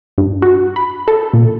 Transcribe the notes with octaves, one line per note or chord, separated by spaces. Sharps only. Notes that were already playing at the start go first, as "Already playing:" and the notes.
G2
F#4
B5
A4
A#2